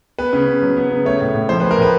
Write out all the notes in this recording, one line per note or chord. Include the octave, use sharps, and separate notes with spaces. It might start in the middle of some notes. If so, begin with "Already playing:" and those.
B3 B4
C#3
C#3
F#3
B3
C#3
A3 C#5
A2
A2
F3 C5
B4
A3
A#4
A2 B4